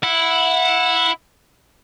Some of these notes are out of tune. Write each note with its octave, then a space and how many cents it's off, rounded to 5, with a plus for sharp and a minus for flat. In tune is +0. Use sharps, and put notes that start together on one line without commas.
E4 +0 F#5 -20